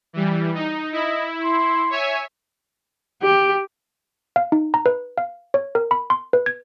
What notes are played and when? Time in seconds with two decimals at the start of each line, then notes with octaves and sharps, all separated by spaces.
0.13 E3 G3
0.54 D#4
0.92 E4 D#5
1.43 C6
1.90 C#5 E5 G#5
3.22 G4
4.36 F5
4.52 D#4
4.74 A#5
4.86 B4
5.18 F5
5.54 C#5
5.75 A#4
5.91 B5
6.10 C6
6.33 B4
6.46 G#6